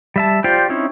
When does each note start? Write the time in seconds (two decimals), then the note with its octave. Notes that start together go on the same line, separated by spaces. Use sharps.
0.16 G3 E5 A5
0.44 F4 G4 C5 D5 G5
0.69 C4 C#4 D#4 E4